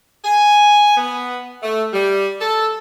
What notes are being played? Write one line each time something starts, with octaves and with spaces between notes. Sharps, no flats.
G#5
B3
A3
G3
A4